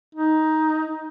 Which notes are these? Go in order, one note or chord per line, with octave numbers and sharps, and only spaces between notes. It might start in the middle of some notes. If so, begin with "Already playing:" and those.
D#4